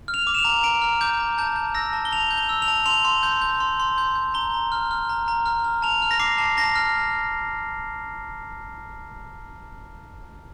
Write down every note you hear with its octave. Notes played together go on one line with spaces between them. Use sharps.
F6
F7
D6
E7
F7
A#5
A#5 D7
F6
D6 G6
A#5
A5 G6
G6
E6 A#6
A5
G7
A5 F7
G6
G7
E6
F7
A5
C6 F7
C6
G6
G6
C6
C6
G6
G6
A#5 G7
A#5
F6
F6
A#5
A#5
F6
F6
A5 F7
F6
A#6
D6 C7
A5
A5 A#6
F6